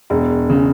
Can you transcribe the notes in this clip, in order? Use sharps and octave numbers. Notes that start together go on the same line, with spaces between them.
E1
C#3